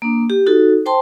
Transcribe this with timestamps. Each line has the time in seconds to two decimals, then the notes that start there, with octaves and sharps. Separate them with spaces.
0.02 A#3 D4
0.30 G4
0.46 D#4 F#4 A4
0.86 C5 G5 A5 C6